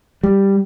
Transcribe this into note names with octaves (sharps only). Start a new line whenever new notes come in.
G3